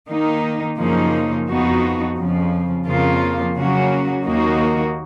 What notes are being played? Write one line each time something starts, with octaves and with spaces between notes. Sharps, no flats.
D#3 A#3 D#4
F#2 C#3 F3 A#3 D#4
F2 F3 B3 D#4 F#4
F2 C#3 F3
F2 C#3 F3 A#3 F4
C#3 F#3 A#3 C#4 F#4
D#2 D#3 A#3 D#4 F#4